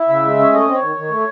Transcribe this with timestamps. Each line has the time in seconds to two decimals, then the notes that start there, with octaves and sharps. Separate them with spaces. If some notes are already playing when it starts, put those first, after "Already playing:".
Already playing: E4
0.09 C#3 E5
0.23 G#3
0.39 C#4
0.53 A3 D#5
0.67 C4
0.74 C#5
0.82 D#3
0.96 D#3
1.11 A3